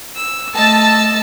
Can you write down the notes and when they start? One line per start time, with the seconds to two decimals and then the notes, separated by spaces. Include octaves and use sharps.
0.15 E6
0.55 A3 D#5 A5 E6